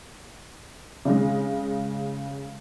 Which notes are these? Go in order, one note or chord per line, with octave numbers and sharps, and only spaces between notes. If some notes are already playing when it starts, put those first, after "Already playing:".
C#3 G#3